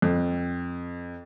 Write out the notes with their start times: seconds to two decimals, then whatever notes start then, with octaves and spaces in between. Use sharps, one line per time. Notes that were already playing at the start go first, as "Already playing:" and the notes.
0.02 F2